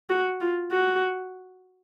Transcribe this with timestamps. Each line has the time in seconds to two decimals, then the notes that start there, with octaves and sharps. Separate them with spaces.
0.09 F#4
0.40 F4
0.71 F#4